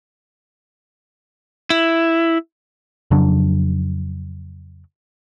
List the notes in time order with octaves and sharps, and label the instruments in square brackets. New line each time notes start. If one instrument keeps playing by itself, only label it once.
[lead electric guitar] E4
[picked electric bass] F2 C#3 F#3 D4